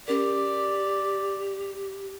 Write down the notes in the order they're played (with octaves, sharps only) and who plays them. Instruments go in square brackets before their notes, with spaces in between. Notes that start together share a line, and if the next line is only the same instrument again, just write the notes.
[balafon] C#4 A#4 [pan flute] G4 [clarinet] D5